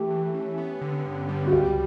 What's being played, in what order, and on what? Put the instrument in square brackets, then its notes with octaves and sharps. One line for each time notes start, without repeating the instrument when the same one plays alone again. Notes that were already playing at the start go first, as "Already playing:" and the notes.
Already playing: [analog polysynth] E3 A3 [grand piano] G4
[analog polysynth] E3
C#4
B3
D3
G2
G3
[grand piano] F#4
[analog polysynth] C#2 [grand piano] G4